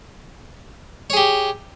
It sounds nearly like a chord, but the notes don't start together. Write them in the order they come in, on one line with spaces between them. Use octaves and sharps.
C#5 G#4 G4